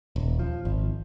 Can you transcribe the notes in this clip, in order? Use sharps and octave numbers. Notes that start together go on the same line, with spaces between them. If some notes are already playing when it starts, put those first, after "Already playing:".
D#1
F3
G#1